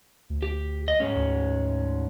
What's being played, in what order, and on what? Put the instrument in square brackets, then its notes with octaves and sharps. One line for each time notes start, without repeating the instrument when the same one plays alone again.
[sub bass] D2
[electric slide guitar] G4
D#5
G#2 G#3 C#4
[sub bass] D2